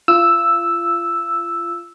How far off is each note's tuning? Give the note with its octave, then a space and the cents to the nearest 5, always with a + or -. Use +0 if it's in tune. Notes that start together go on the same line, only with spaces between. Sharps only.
F4 -30 E6 +0